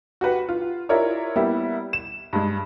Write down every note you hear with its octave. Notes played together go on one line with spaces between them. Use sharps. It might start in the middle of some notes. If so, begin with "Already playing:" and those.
F#4 G4 B4 F#5
F4
E4 F4 G4 A#4 C#5 D5
G3 A#3 B3 E4 G4
E7
G2 G#3